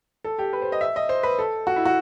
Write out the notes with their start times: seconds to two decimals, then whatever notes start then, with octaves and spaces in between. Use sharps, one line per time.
0.24 A4
0.39 G4
0.53 B4
0.62 C5
0.72 D#5
0.81 E5
0.96 D#5
1.09 C5
1.23 B4
1.39 A4
1.67 F#4
1.76 E4
1.85 F#4